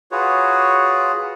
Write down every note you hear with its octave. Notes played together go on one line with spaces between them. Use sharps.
F4 F#4 G#4 B4 C#5